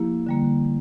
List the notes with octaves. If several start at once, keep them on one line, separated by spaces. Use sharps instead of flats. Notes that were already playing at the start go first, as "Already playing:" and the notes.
Already playing: F3 A#3 E4 G4
D3 G3 A#3